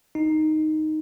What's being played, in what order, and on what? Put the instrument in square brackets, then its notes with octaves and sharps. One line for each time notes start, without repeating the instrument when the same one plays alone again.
[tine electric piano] D#4